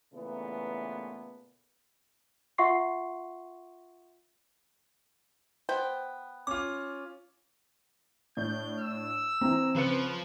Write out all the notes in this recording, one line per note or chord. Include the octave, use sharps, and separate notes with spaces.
A#2 C#3 E3 A3 B3
F4 E5 F#5 C6 C#6 C7
B3 C5 G5
C#4 F4 D6
A2 D4 G6
E6
E3 C4 A#5
C#3 F3 B4 C#7